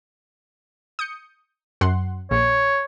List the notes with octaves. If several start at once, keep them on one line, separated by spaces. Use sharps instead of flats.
D#6 G6 C#7
F#2 F#5 C6
A#1 C#5